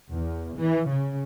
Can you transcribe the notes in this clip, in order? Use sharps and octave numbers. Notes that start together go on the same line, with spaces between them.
E2
E3
C#3